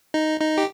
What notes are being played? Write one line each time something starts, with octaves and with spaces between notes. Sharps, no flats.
D#4
D#4
G4